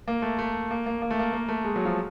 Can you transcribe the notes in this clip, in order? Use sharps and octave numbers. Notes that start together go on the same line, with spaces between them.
A#3
A3
A3
A#3
A#3
A#3
A3
A#3
A#3
A3
G#3
F#3
F3